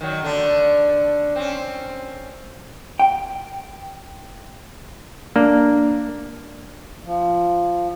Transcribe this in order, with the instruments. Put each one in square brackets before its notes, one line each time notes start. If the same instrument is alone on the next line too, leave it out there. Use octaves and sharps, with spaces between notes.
[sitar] D#3 F#3
D3 A3 D4
C4 C#4
[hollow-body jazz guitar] G5
[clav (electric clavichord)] A#3 [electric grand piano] D4
[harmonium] F3